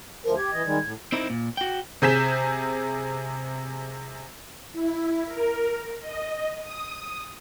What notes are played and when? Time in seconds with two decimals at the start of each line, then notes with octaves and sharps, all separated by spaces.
0.24 D2 F3 A#4
0.37 G4 G#6
0.53 E3 D#5
0.65 D#3 G3 G#3
0.83 A2
1.12 C4 D#4 E4 A#4
1.30 A#2
1.57 F#4 G5
2.02 C3 G#4 G6 B6 E7
4.73 E4
5.26 A#4
6.00 D#5
6.61 D#6